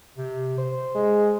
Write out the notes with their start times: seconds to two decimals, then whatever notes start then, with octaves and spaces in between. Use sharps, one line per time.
0.17 C3
0.58 C5
0.95 G#3